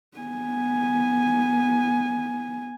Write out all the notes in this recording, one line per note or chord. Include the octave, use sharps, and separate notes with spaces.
B3 G#5